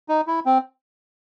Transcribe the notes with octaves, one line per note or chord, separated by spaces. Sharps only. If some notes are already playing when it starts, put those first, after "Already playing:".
D#4
E4
C4